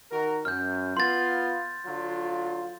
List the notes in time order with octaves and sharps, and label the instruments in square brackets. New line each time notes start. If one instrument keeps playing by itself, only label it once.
[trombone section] D#3 F#4 A#4
[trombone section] F#2 [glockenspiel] F6 G6
[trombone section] B3 F4 [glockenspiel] C6 A6
[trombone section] D3 F#3 F4